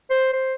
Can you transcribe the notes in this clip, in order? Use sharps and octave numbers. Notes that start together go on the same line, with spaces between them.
C5
C5